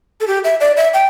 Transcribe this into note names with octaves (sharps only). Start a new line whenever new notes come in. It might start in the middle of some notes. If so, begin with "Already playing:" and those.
A4
G4
E5
D5
E5
G5